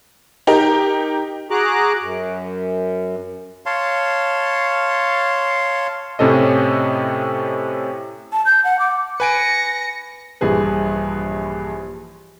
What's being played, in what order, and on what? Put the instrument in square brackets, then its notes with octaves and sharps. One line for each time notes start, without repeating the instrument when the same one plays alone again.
[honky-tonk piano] D#4 G4 A#4
[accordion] F#4 G#4 A#5 D6 F#6
F#2
[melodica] C#5 F5 A5 C6
[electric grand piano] A2 C3 C#4 A4 D#5
[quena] A5
G6
F#5
D6
[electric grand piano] B4 G#5 D7 [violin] A#6 C#7
[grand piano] A#1 G2 E3 G#4 B4